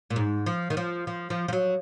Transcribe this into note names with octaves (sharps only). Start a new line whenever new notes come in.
A#2
G#2
F3
D#3
F3
F3
F3
F3
F#3